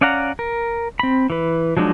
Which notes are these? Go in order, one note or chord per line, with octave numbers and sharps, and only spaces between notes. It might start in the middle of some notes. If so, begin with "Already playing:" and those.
C#4 D5 F5 F#5 A#5
A#4
C4 B5
E3 B4
F3 F#3 G#3 D4 D#4